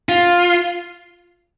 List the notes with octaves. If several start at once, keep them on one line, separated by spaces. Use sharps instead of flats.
F4